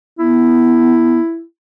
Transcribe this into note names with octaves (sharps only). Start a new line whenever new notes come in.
B3 E4